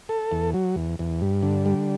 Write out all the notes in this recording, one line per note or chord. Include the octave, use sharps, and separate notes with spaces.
A4
E2
F#3
E2
E2
G2
D3
G3